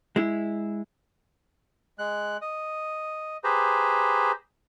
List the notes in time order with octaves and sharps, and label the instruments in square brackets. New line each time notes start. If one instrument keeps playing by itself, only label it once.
[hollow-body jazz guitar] G#3 E4
[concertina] G#3 F#6
D#5
G4 G#4 B4 C5 A#5